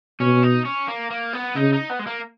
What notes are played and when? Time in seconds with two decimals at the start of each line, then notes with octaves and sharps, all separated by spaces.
0.20 B2 C#4
0.43 D#4
0.65 C#4
0.88 A#3
1.11 A#3
1.33 B3
1.56 C#3 D#4
1.73 D#4
1.90 B3
1.99 G#3
2.07 A#3